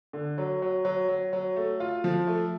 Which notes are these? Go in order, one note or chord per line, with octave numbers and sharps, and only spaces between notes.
D3
F#3
F#3
F#3
F#3
F#3
A3
F4
F3
A3